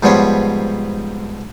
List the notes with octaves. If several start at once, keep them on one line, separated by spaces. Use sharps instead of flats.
G#2 F3 G3 B3 C#5 C6